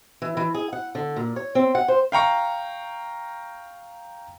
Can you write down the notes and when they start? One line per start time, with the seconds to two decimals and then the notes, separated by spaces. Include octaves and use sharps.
0.22 E3
0.37 E3
0.54 G#4
0.73 F#5
0.95 D3
1.16 A#2
1.36 C#5
1.55 C4
1.75 F#5
1.88 C5
2.12 F5 G5 A#5 C#6